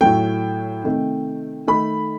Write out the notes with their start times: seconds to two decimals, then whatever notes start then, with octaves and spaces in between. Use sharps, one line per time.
0.01 A2 F#3 A3 G5
0.84 C3 D#3 A3
1.67 D#3 A3 B5